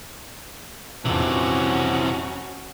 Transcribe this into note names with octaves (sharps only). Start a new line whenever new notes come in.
A#1 F2 C3 E3 C#4 F#4